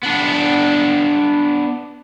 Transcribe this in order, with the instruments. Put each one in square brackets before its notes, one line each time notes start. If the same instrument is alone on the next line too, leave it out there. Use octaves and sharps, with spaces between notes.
[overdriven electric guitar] B3 D4